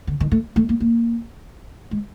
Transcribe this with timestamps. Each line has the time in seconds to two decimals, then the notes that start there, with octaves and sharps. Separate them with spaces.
0.07 D3
0.20 D#3
0.31 A3
0.56 A3
0.69 A#3
0.80 A#3
1.91 G#3